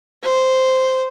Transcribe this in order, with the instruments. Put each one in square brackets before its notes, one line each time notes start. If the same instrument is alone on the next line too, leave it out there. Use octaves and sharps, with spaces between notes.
[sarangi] C5